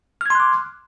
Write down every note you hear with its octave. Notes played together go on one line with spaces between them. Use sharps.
C6 D6 F6 F#6 G#6